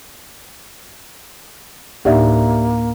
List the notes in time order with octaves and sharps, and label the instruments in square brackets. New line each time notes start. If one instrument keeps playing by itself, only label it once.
[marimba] D2 A2 D#4 [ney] A#3 [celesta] G4 D5 E5